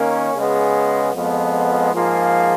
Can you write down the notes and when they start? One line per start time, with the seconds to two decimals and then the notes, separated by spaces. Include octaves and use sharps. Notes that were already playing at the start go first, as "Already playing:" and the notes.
Already playing: D#3 A#3 C#4
0.35 C#3 G#3 B3
1.13 F2 F3 G#3 B3
1.92 G#2 F3 A#3 F4 G#4